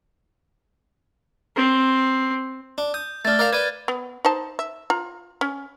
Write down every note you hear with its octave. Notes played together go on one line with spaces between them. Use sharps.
C4
D4
D#6 G6
A3 D4 F6 A6
A#4 D5 F5 D6
B4 D5 G#6 D#7
B3
D#4 C5 A5
E5
F4 A#5
C#4